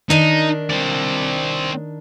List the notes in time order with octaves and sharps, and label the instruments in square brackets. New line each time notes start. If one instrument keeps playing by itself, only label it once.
[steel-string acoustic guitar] D#3 D4 [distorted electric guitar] D#4
[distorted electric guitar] C4 D5